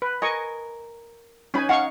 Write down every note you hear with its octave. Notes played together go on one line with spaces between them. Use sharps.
B4
A#4 D#5 G#5 C#6
C#4 D#4 B4 G#5 B5
D#4 F5 F#5 C#6